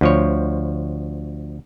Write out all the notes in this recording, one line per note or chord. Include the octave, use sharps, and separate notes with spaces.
D2 F3 C#5